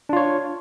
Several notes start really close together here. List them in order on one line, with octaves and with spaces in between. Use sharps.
D4 F4 C#5